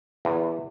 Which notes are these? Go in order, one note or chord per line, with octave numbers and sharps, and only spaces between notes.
E2